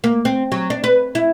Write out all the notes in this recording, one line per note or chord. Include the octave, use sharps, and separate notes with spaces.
A#3
C4
F#3
D4
B4
E4